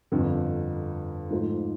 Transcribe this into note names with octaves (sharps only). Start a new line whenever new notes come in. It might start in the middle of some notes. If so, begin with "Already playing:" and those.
G1 F2 D3
G#2 F3 A3